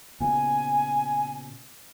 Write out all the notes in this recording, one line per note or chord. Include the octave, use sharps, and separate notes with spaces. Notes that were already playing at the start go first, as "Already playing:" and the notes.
A#2 C#3 B3 G#5